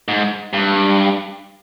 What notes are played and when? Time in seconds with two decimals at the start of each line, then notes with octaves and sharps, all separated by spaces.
0.08 G#2
0.53 G2